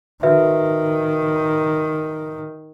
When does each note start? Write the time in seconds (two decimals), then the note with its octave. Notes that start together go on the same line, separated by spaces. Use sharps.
0.23 D#3 F#4 B4 E5